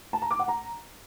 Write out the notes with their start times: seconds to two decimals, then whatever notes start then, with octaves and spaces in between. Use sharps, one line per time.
0.13 A5
0.22 A#5
0.31 D6
0.39 F#5
0.48 A#5